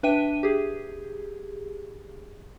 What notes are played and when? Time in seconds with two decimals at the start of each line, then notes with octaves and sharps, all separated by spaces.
0.03 D4 B4 E5 G5 D#7
0.43 G4 G#4